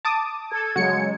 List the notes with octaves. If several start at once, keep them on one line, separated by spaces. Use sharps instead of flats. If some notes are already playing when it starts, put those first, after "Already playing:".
A5 D6 D#6
A4 G#6
C#3 F#3 G#3 F#4 C#7